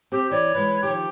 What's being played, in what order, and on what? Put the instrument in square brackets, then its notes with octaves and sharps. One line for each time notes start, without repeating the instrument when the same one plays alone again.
[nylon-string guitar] C4 [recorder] G4
[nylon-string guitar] E3 [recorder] C#5 [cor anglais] D5
[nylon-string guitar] E3 G#3 [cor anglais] B4
[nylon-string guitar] D#3 F3 [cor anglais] G4